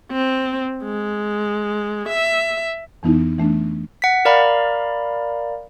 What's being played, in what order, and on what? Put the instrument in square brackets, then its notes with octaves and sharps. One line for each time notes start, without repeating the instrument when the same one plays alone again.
[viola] C4
G#3
E5
[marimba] F2 E3 B3 D#4 E4
E3 A3 D4
[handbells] F#5 B6
A#4 D5 F5 A#5 B5